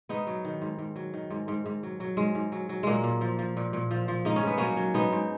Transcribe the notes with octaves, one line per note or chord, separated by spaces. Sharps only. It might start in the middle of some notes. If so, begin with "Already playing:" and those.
G#2 B3 D#4
F#3
D#3
G#2
G#2
F#3
D#3
G#2
G#2
G#2
F#3
F#3
G#2 G#3
G#2
F#3
F#3
A#2 G#3 A#3
A#2
F3
F3
A#2
A#2
F3
F3
G#2 D#4
C#4
G#2 B3
F#3 A#3 C#4
F#3
G#2 B3 D#4
G#2